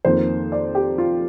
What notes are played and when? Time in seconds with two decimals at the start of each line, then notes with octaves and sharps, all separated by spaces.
0.05 F2 D#3 A#3 C5
0.52 D5
0.75 G4
0.98 F4